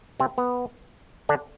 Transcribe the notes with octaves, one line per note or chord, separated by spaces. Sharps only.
C3 C4
B3
D3 D4